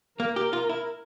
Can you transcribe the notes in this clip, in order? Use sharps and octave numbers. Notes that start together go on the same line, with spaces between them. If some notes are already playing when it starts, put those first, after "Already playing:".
A#3 A#4
G4
F4
E4